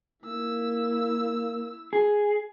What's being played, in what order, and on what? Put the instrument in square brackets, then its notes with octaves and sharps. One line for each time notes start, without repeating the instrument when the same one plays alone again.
[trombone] A#3 [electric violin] E4 E6
[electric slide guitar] G#4